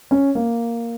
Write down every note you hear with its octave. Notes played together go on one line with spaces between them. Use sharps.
C#4
A#3